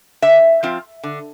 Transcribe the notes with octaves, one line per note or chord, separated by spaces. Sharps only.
D3 E5
F3 C4 F4
D3